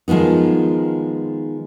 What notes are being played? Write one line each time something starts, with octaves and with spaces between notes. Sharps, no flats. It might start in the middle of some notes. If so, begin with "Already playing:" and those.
D#3 F3 G#3 B3 D#4